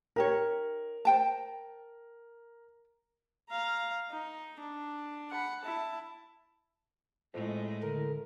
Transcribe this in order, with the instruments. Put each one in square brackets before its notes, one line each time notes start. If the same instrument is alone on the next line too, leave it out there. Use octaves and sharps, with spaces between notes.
[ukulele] D#4 G4 C#5 [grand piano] A#4
[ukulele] C5 G5 A5
[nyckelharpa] F5 A#5
D#4
D4
F#5 B5
E4 A5
[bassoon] F2 [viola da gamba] A2 G#3
[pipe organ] D3 [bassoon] A#4